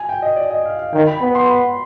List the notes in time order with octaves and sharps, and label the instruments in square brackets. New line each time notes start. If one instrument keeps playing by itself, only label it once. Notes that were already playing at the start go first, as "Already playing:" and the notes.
Already playing: [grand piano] G#5
G5
D#5
D5
D#5
F5
F5
[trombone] D#3 [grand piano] G5
[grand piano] B5
[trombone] B3 [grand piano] B5
[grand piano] C6
B5